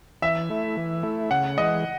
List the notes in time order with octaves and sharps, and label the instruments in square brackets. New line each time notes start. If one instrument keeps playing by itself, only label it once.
[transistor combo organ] E3 [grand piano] E5
[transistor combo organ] A3 E4
E3
A3 E4
[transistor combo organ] C#3 [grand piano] F#5
[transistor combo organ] E3 G#3 [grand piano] D#5